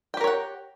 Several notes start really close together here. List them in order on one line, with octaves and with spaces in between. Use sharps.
G5 G4 A#4 C#5 F#5